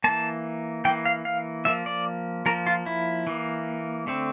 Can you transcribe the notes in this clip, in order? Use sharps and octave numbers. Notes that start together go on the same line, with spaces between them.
E3 A#3 A5
E3 A#3 G5
F5
F5
F3 A#3 E5
D5
F3 A#3 A#4
F4
E4
E3 A#3
D3 A3 C4